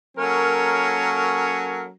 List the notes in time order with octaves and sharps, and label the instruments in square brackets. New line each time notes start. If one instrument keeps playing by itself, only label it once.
[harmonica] F#3 C#4 [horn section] A#3 A4 A#4